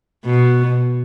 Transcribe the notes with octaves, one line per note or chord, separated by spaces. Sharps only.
B2